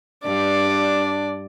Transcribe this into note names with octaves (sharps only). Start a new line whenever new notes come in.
G2 D4 D5